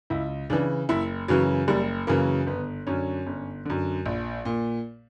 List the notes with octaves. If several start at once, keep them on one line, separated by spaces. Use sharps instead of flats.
C#2 E4
C#3 E3 D4
F#1 E4
F#2 C#3 E3 F#3
F#1 G3
F#2 C#3 E3 A#3
G1 B3
F#2 D3 C#4
G1
F#2 D3
A#1
A#2